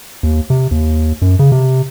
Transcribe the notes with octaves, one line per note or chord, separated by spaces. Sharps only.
D#2
C3
D#2
F#2
C#3
C3